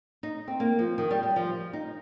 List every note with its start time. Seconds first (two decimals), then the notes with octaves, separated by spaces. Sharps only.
0.23 D#4
0.48 C4
0.60 A#3
0.79 F3
0.98 D#3
1.11 G3
1.23 G3
1.36 F3
1.73 D#4